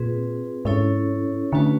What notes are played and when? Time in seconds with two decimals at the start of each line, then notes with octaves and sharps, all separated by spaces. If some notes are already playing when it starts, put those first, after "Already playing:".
Already playing: A#2 C4 F4 G#4 B4
0.65 G#2 C#4 E4 A4 C#5
1.52 D3 A3 C#4 F#4 B4